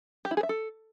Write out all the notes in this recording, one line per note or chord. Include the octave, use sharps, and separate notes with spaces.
G4
E4
G#4
E5
A4